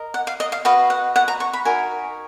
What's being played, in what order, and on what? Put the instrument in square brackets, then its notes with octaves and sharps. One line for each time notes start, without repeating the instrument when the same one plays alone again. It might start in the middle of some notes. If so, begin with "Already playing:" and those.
Already playing: [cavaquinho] A#4 D#5
F#5
F5
D#5
F5
F#4 B4 D#5 F5
F#5
F#5
A#5
C#6
B5
D#4 F#4 A#4 G#5